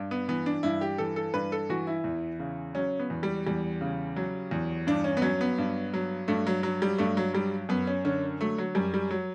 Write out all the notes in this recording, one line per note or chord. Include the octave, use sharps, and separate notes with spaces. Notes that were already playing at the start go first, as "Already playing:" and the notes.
Already playing: G2
B3
E3 B3
D4
G2 E4
G4
E3 A4
A4
G2 B4
A4
E3 F#4
E4
E2
C#3
F#3 C#4
B3
E2
G3
E2 G3
C#3
F#3
E2
G2 D4
C#4
B3
F#3 C#4
B3
G2
F#3
G2 A3
F#3
F#3
G3
G2 A3
F#3
F#3 G3
F#2 B3
C#4
D3 C#4
F#3 A3
F#3
F#2 G3
G3
F#3